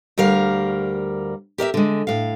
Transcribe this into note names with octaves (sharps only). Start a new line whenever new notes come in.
D2 G3 A#4 F5
G4 A#4 D#5 E5
D3 G#3
A2 F5